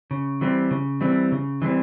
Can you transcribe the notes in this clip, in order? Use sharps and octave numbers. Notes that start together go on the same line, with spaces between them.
C#3
E3 G3 C4
C#3
E3 G3 C4
C#3
E3 G3 C4